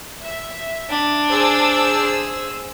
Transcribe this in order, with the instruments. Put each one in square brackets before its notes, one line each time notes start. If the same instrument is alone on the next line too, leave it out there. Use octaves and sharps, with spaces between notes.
[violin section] E5
[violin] D4
[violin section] G#4 C5 E6